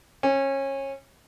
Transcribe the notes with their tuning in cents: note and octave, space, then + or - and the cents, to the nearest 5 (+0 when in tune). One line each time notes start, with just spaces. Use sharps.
C#4 -25